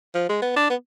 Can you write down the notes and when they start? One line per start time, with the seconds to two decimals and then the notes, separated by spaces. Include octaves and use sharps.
0.15 F3
0.29 G#3
0.42 B3
0.56 D4
0.70 B3